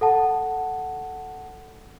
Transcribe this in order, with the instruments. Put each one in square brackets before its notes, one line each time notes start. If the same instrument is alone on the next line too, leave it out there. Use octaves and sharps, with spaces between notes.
[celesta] A4 F#5 A5